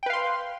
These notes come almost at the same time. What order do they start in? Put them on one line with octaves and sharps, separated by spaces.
G5 B4 F5 C6